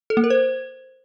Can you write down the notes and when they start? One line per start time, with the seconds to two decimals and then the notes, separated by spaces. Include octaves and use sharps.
0.10 A4
0.17 A#3
0.24 A#4
0.30 C5